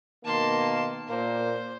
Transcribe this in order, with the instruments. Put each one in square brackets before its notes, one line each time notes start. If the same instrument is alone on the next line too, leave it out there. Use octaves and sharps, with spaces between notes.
[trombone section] B2 D#3 A#3 [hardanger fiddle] A5 C6
[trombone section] A#2 A#3 [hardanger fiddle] C5